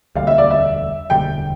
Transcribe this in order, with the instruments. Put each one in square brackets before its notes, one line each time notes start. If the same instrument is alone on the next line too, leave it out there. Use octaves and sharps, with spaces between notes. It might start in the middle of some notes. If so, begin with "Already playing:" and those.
[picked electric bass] E1 D2 D3 G3 [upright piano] F5
[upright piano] E5
D5
E5
[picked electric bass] E1 D2 D3 G3 [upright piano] G5